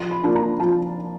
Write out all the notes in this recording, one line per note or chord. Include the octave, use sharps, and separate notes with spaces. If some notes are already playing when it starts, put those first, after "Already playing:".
Already playing: F3 C6
B5
A#3 D4 F4
A#5
F3 A5